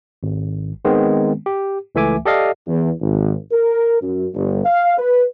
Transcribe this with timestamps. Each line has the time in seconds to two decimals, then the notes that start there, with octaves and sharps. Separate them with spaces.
0.23 G#1
0.85 D#3 G#3 B3 C4
1.46 G4
1.95 C#2 E3 A3 E5 G#5 D6
2.26 G4 A4 D5 D#5 F5
2.67 E2
3.01 G#1
3.51 A#4
4.02 F#2
4.34 G1
4.65 F5
4.98 B4